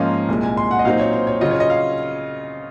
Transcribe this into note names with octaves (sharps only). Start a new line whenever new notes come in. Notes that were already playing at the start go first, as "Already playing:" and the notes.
Already playing: G#2 F3 A#3 C#4 F4 D#5 F5
C2 A#2 G#3
G#5
C6
F#5
D#5
A#2 F#3 C4 D#4 F5
C#5
C5
C#5
C#3 F#3 C#4 F4 D#5
C#5
D#5
F5